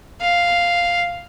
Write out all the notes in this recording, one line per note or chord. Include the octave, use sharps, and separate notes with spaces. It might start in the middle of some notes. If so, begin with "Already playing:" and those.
F5